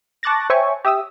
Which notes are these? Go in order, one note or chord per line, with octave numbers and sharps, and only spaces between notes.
A5 C#6 D6 F#6 A6 A#6
C5 C#5 E5 G5 G#5 C#6
G4 E5 D#6 E6